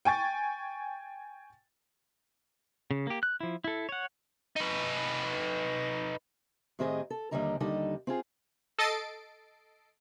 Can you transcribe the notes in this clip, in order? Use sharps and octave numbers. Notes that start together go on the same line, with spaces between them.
G5 G#5 C#6 A6
C#3
A#3 G4
F#6
F3 E4
E4 A4
C#5 F#5
D#4 B4
A2 D#3 C4 G4 G#4 D#5
A4
D#2 D3 F3 G3 D#5 A#5
D#2 D3 G3 D#4 A4 D#5
C4 F4 G#4
A4 D#5 A6 C7 D7